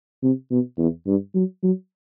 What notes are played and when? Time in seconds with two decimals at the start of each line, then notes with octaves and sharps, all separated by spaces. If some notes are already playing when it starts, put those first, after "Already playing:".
0.22 C3
0.51 B2
0.78 E2
1.07 G2
1.35 F#3
1.63 F#3